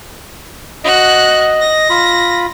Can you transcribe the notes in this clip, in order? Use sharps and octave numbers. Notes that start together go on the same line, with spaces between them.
F#4 D#5 F#6
A#6
F4 B5